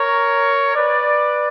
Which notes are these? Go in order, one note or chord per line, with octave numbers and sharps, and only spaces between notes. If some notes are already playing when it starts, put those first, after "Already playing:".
Already playing: A#4 C#5
B4 D5